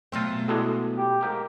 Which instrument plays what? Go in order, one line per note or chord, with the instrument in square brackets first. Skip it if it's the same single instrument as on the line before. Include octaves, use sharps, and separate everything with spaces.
[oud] B2 F#3 A3 [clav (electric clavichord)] C4 F4
[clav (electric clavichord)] A2 D3 G#3 [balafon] E4 F#4 A4
[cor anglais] G4
[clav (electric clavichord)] G#2 G4 [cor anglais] A#3